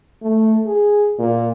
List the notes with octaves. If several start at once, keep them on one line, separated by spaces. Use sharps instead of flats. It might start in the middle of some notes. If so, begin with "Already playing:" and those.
A3
G#4
A#2